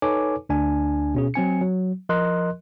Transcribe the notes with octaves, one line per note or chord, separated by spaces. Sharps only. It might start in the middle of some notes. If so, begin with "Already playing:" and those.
D#4 A4 B4 C#5 G#5 D6
D2 D4 G#5
B2 C#4 G#4
F#3 C4 G#5 C#7
F#3
F3 A#4 D#5 C6 F#6